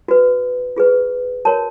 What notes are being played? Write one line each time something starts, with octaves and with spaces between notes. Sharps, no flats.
F#4 B4
F4 G#4 B4
F#4 A#4 C#5 A5